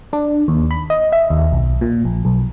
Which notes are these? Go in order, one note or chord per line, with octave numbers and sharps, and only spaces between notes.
D4
D#2
B5
D#5
E5
D#2
B1
A#2
A#1
B1